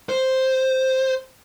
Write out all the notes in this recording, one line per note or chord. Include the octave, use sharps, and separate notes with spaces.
C5